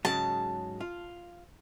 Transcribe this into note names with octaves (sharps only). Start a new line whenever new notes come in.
G#2 C#3 F#3 A5
F4